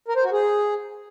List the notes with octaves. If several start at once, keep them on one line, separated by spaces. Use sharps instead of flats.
A#4
C5
F#4
G#4